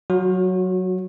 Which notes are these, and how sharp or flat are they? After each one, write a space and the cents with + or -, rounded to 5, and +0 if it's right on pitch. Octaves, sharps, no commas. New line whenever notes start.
F#3 +0 F#4 -30